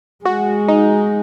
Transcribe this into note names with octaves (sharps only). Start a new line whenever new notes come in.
G#3 F#4
D#4